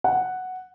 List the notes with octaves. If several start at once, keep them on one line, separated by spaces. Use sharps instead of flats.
F#5